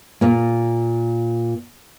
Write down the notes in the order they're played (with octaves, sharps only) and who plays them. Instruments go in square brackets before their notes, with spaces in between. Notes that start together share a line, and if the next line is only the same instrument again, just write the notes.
[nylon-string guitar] A#2 A#3